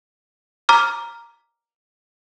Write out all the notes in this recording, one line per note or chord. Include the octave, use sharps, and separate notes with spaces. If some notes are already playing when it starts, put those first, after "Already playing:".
A#5 D6 F6